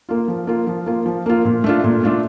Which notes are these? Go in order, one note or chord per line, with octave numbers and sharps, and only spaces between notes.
A#3 F4
F3
A#3 F4
F3
A#3 F4
F3
A#3 F4
A#2
A3 D4 F4
A#2
A3 D4 F4